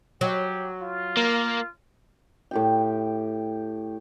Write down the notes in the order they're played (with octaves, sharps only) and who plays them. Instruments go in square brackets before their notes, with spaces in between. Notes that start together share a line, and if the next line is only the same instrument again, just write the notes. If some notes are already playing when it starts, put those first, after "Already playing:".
[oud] F#3 [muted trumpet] G4
[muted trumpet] F4
[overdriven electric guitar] A#3
[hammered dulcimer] A2 G4 G5